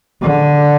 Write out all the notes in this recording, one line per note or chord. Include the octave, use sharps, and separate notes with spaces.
D3